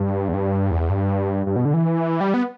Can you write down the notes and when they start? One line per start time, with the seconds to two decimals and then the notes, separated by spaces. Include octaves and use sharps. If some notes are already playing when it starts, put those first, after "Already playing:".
Already playing: G2
0.28 E2
0.34 G2
0.71 E2
0.90 G2
1.46 G2
1.56 B2
1.65 D3
1.74 E3
2.21 G3
2.34 B3